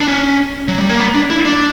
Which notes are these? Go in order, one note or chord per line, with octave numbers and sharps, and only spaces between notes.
D4
C#4
F#3
G3
A#3
B3
D4
E4
D4